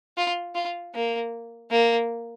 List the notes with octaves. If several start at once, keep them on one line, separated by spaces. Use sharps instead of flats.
F4
F4
A#3
A#3